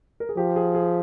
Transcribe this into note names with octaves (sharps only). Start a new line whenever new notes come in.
A#4
G#4
F3 G4
G#4
G#4